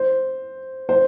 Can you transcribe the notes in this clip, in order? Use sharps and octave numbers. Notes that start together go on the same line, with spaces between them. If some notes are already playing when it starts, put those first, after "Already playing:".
Already playing: C5
C5